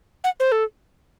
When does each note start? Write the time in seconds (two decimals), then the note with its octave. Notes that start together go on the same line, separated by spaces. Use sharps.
0.24 F#5
0.40 C5
0.52 A4